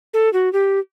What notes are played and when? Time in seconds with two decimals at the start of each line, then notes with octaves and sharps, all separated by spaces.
0.14 A4
0.33 F#4
0.53 G4